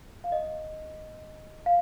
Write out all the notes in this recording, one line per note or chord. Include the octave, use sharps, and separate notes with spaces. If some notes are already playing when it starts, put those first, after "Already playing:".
F5
D#5
F5